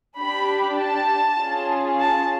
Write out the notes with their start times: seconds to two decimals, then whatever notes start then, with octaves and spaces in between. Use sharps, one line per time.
0.19 D4 G4 B5
0.79 A5
1.39 C#4 F4 G#4
1.99 A5